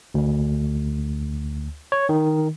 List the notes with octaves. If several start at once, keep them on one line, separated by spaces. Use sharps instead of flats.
D2
C#5
D#3